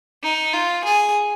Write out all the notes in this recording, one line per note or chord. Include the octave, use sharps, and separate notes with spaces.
D#4
F4
G#4